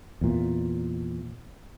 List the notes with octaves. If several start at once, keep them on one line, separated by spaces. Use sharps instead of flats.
E2 A#2